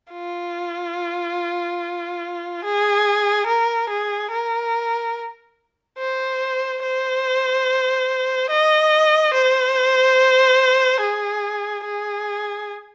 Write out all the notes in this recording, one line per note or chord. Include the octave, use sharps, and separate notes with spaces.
F4
G#4
A#4
G#4
A#4
C5
C5
D#5
C5
G#4
G#4